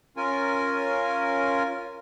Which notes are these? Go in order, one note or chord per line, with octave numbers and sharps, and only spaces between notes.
C#4 F4 A#4 G#5